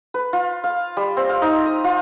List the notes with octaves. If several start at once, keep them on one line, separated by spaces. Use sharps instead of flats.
B4
F4
F5
G3
C4
F5
D#4
D#6
F4